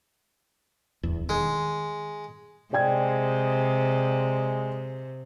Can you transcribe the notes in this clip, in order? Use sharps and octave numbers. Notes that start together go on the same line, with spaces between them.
D1 E2
D#3 G#3
C3 G#3 D5 G5 G#6